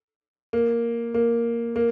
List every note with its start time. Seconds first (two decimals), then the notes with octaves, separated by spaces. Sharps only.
0.53 A#3
1.14 A#3
1.76 A#3